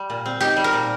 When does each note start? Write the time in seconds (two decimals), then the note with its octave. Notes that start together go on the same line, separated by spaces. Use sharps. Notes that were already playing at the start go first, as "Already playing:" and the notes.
Already playing: G3
0.10 A#2
0.26 C4
0.41 D#4 G4
0.57 G3
0.64 A#4
0.73 A#2